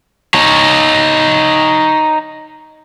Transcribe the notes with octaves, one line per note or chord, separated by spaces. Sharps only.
D#4 C#5